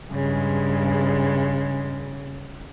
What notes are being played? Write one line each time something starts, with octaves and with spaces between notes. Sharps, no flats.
G2 C#3 G#3